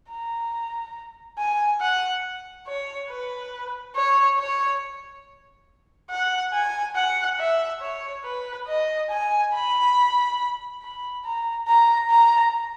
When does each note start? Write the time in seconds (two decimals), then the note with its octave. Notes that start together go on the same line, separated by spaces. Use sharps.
0.10 A#5
1.39 G#5
1.81 F#5
2.67 C#5
3.09 B4
3.96 C#5
4.39 C#5
6.10 F#5
6.53 G#5
6.95 F#5
7.38 E5
7.81 C#5
8.24 B4
8.67 D#5
9.10 G#5
9.53 B5
10.82 B5
11.24 A#5
11.68 A#5
12.10 A#5